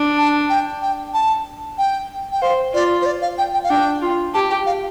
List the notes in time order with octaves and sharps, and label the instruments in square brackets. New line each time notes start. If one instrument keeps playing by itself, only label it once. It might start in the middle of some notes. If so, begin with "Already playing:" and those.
Already playing: [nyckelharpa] D4
[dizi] A5
G5
G5
A5
G5
G5
[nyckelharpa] C5 [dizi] F5
[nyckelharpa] F4 [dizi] D5
[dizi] C5
D5
F5
G5
G5
F5
[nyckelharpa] D4 [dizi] G5
[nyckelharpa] F4
[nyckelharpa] G4 [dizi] A5
[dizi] G5
F5